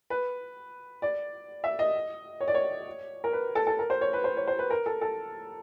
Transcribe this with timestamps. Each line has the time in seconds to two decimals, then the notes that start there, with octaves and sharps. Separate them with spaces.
0.10 B4
1.02 D5
1.64 E5
1.79 D#5
2.40 C#5
2.48 D5
2.54 C#5
3.24 A#4
3.33 B4
3.55 A4
3.67 A4
3.79 A#4
3.90 C5
4.01 C#5
4.13 B4
4.24 C5
4.37 C#5
4.47 C5
4.59 B4
4.70 A#4
4.86 A4
5.01 A4